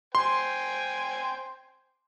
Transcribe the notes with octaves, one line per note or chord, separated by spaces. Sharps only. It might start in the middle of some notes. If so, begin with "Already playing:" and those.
C5 G5 G#5 C6